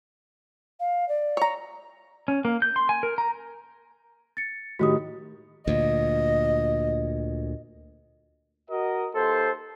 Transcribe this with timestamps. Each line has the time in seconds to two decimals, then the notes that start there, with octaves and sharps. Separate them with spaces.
0.80 F5
1.08 D5
1.37 C#5 A#5
2.28 C#4
2.45 A#3
2.62 G6
2.76 C6
2.89 G#5
3.03 A#4
3.18 A#5
4.37 A6 C#7
4.79 A2 D#3 F#4 G4 D#6
5.68 D2 A#2 D#5
8.70 F#4 A#4 D#5
9.15 D#2 A4 C5